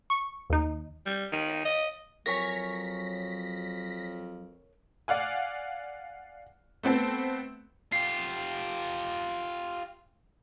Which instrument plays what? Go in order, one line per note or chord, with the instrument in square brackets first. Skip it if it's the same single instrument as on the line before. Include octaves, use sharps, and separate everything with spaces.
[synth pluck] C#6
D#2 D#4
[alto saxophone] G3
D#3
D#5
[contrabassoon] F2 [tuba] F#3 [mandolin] A#4 C#5 G#5 [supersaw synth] A#6 B6
[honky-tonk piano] D5 F5 F#5 G#5
A3 B3 C4 A4
[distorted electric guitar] F4 G4 [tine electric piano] C7